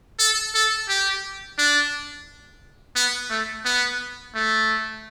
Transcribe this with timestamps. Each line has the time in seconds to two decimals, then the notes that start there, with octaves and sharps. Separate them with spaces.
0.19 A4
0.55 A4
0.89 G4
1.59 D4
2.96 B3
3.30 A3
3.65 B3
4.35 A3